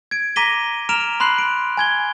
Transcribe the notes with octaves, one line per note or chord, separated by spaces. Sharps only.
G#6 D7
A#5 D6 A#6 B6 D#7 G7
A#5 F6 D7 E7 F7
B5 C6 F#6 C7 F#7
D7
G#5 G#6 G7